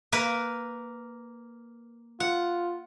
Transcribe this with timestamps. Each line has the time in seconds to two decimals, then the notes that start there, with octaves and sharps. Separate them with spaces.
0.12 A#3 A#4 B4
2.20 F4 F#5